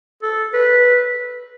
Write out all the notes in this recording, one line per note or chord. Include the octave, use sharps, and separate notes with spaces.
A4
B4